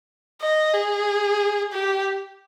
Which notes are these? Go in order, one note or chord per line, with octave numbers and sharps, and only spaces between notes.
D#5
G#4
G4